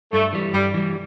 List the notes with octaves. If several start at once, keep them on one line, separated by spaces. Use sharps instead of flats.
G2 A3
E3 G3
G2 G3
E3 G3